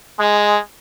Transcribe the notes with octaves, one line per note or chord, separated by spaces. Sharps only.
G#3